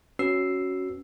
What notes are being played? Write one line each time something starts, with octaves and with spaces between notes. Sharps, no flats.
C#4 F#4 B4 E6 C7